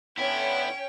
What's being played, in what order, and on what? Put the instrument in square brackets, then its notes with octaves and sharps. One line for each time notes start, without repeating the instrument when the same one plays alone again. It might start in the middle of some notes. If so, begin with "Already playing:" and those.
[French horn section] A2 D3 B3 [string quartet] C#4 C#5 [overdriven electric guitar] E4 E5 [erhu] G5